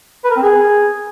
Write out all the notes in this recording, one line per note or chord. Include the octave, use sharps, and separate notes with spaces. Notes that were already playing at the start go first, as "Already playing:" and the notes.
B4
A#4
C4
G#4